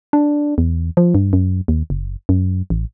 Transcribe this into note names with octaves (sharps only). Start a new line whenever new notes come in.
D4
E2
F3
G2
F#2
D#2
F#1
F#2
A1